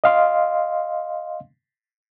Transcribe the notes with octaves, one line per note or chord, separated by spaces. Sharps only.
D#5 F5 C6